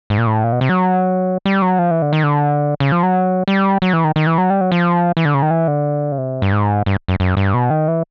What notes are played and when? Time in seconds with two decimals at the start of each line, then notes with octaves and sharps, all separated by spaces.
0.10 G#2
0.18 A#2
0.27 A2
0.44 A#2
0.52 B2
0.61 C3
0.69 F#3
1.45 G3
1.62 F#3
1.79 F3
1.91 E3
2.02 D3
2.13 D#3
2.24 D3
2.80 C#3
2.92 F3
3.03 F#3
3.48 G3
3.82 F#3
3.93 E3
4.04 D#3
4.16 D#3
4.27 E3
4.38 F#3
4.50 G3
4.61 F#3
4.72 F3
5.17 E3
5.25 D3
5.34 C#3
5.42 D#3
5.51 E3
5.68 D3
6.12 C#3
6.18 C3
6.42 G2
6.52 G#2
6.86 G2
7.08 F#2
7.20 F#2
7.37 G2
7.54 B2
7.70 D#3
7.88 E3